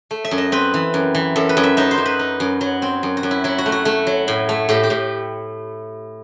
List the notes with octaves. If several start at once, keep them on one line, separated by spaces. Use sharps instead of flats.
A3
E5
F#2
D#5
C4 B4
E3
F#2
E3
F#2 A4
B4
F#2
E5
D#4 E5
C5
F#2
B4
D#4
F#2
F#3
C4
F#2
F#4
F#2
E4
F#3 E4
F#4
A3
F#4
A3 E4
F#3
A2
A3
A2 G4
G4
A2